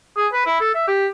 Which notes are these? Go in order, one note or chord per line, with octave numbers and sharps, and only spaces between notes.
G#4
B4
E4
A4
E5
G4